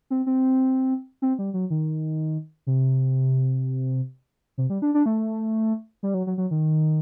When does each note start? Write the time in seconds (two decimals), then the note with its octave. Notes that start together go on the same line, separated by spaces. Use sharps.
0.10 C4
0.26 C4
1.22 C4
1.39 G3
1.54 F#3
1.70 D#3
2.67 C3
4.58 C3
4.70 G3
4.82 D4
4.94 D4
5.06 A3
6.03 G3
6.14 F#3
6.27 F#3
6.38 F#3
6.51 D#3